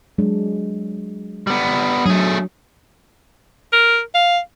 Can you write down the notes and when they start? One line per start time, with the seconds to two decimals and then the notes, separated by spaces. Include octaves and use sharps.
0.18 F#3 G#3 D4
1.47 G3 B3
2.06 F#3 A3 D4 G#4
3.73 A#4
4.15 F5